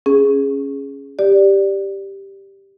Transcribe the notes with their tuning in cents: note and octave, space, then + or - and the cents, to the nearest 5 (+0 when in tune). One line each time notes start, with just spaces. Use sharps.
C#4 +0 G#4 +0
G4 +0 D5 +0